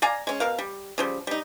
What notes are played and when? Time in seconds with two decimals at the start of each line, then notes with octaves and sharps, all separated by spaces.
0.02 D5 F5 G#5 A#5
0.27 G#3 C#4
0.40 B2 A#4 F5
0.58 G3
0.98 C#3 F3 G3
1.27 G3 D#4